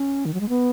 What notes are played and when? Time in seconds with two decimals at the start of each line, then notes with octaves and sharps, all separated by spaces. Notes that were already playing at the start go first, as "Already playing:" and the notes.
Already playing: C#4
0.25 D#3
0.34 F#3
0.40 G#3
0.49 B3